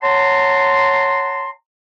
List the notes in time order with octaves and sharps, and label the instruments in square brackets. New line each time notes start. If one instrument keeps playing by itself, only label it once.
[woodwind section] C#5 F#5 A5 A#5 C6